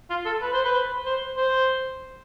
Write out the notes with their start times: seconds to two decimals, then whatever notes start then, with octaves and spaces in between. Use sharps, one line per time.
0.10 F4
0.25 A4
0.42 B4
0.53 C5
0.65 B4
1.05 C5
1.37 C5